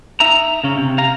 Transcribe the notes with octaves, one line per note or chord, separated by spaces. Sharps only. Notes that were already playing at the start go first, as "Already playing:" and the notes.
D#4 E5 A#5
C#3 C#4
C3
F5 A#5